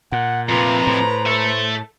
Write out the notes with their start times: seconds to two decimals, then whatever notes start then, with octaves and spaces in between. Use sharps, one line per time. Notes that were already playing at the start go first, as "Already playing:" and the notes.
0.12 A#2 F#5
0.49 F2 C3 F4 B4 A#5
0.87 A2 C5
1.27 A4 E5